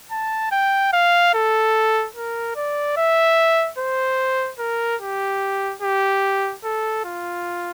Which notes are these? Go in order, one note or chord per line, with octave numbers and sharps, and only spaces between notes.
A5
G5
F5
A4
A#4
D5
E5
C5
A#4
G4
G4
A4
F4